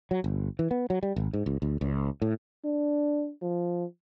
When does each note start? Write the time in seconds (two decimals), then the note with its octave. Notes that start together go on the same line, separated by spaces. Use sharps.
0.11 F#3
0.24 G1
0.59 E3
0.71 B3
0.90 F#3
1.03 G3
1.16 G#1
1.33 G#2
1.46 C#2
1.62 D2
1.81 C#2
2.22 A2
2.65 D4
3.42 F3